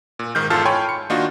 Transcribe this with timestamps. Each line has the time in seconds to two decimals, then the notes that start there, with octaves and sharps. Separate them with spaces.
0.19 A#2
0.35 G#2 D#3 F6 G6
0.50 E2 G#2 F4 A4 A5 F6
0.65 C#5 G5 G#5 B5 C6
0.89 C#7
1.10 D#3 A#3 D4 D#4 F4 F#4